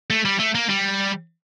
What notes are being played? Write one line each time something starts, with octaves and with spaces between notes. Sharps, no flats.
A3
G3
A3
A#3
G3